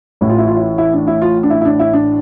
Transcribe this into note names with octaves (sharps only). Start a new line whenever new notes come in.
A1 A2 E3 E4
F4
E4
F4
E4
E4
D4
E4
F4
D4
E4
E4
D4
E4
D4